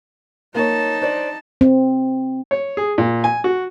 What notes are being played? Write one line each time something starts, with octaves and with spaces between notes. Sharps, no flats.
A#3 D#4 C#5 A5
D4 C5 D5
C4
C#5
G#4
A#2
G#5
F#4